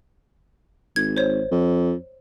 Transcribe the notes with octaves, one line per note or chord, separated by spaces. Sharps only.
G#1 G#6
C5 C#5
F2